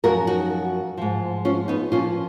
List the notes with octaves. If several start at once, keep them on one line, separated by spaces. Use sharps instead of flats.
F#2 F3 F#4 A#4
D#4 F#4
G#2 F3
C#4 F4
B3 D#4
A#2 F3 C#4 F4